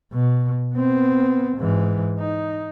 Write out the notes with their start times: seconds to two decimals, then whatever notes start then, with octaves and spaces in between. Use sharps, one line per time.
0.13 B2
0.75 B3 C4
1.58 G#2 E3
2.19 D#4